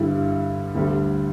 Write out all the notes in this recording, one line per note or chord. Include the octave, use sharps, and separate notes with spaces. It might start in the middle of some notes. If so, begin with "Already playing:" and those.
Already playing: G2 D3 G3 E4
D2 D3 G3